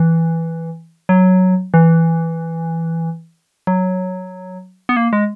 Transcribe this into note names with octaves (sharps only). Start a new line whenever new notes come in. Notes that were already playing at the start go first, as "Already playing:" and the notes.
Already playing: E3
F#3
E3
F#3
B3
A#3
G#3